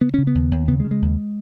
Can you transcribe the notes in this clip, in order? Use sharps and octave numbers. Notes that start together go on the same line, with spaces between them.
C#3 B3
C#3 C#4
B3
D#2
D#2
C#3 B3
G#3
C#3
G#3
D#2